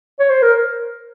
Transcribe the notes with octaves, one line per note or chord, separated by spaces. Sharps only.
C#5
C5
A#4